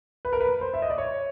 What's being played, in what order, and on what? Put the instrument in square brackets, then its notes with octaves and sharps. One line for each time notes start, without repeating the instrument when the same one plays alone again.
[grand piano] B4
A#4
B4
C5
E5
D#5
D5
C#5